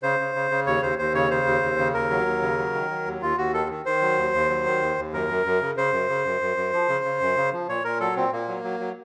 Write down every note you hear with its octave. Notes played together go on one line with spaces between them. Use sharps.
C#3 C5
C#3
C#3
C#3
D#2 C#5
D#2 C5
D#2 C5
C#3 C#5
C#3 C5
D#2
D#2
C#3
D#2 A#4
F#3
D#2
C#3
F#3
D#3
F#3
D#2
D#2 F4
D#2 F#4
D#3 A4
D#3
D#3 C5
F#3
D#2
D#2
F#3
D#3
D#2
D#2
F#2 A#4
F#2
F#2
C#3
C#3 C5
F#2
C#3
F#2
F#2
F#2
F3
C#3
C#3
F#2
C#3
F3
A#2 C#5
A#2 A#4
F#3 A4
A#2 C4
A#2 A#3
F#3
F#3
F#3